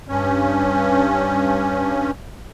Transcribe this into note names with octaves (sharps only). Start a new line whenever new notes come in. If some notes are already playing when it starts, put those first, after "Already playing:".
G2 C#4